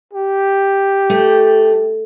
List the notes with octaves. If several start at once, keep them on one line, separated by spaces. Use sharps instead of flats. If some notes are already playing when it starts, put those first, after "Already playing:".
G4
A3